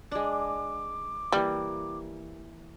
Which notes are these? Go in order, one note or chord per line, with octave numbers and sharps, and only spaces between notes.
G#3 D4 D6
E3 G3 A#3